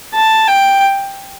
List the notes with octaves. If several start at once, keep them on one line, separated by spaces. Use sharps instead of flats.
A5
G5